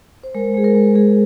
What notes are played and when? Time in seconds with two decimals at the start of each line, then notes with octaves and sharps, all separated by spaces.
0.24 C5
0.35 G#3 A#4
0.54 G#3 G#4
0.64 A#4
0.74 G#3
0.95 G#3 G#4